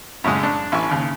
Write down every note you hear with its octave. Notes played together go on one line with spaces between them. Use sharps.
F#2 A2 C#3 G#3
D4
A1 E4 G#5 C#6
D#2 C#3